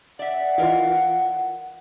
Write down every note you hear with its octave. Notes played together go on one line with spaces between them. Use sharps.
D5 E5 F#5
E3 F4 A#4 D#5 F5